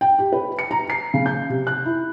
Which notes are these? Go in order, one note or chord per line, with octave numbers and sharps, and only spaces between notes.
G5
G4
B4
C#7
A#5
C7
C#3
G6
C3
F#6
E4